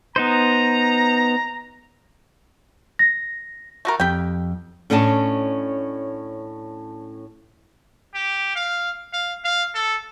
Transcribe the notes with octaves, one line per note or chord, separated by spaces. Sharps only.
B3 D#4 C5 A#5
A#6
A3 F#4 A#4
F2 G4 G5
A2 C#4 D4 D#5 E5 A5
G4
F5
F5
F5
A4